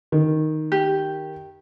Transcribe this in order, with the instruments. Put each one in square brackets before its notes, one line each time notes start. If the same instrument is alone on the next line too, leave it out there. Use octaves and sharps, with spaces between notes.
[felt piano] D#3
[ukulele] G4